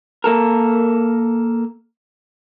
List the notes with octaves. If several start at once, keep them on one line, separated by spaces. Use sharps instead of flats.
A#3 A4 A#4